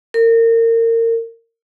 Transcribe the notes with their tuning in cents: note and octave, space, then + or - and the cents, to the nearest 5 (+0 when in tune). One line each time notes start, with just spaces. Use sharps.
A#4 -30